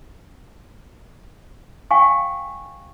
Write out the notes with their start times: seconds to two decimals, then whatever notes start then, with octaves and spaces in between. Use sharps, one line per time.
1.91 F5 G5 G#5 C#6